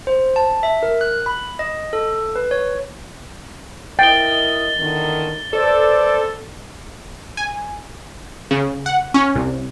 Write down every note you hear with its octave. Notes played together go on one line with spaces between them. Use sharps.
C5
A5
E5
A#4
F#6
B5
D#5
A4
B4
C#5
E4 A#4 D#5 G5 A6 G7
E2 D3 D#3
A4 B4 C5 D5
G#5
C#3
F#5
C#4
C2